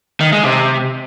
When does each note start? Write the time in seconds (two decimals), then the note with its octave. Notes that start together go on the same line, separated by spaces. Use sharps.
0.20 D#3
0.32 G#3
0.44 C3